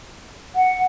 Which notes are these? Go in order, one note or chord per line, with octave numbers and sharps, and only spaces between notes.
F#5